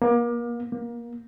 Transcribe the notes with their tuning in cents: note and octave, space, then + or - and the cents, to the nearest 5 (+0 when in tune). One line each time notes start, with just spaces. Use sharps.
A#3 +35
A#3 +25